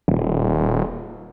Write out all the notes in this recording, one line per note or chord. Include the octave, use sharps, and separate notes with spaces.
D#1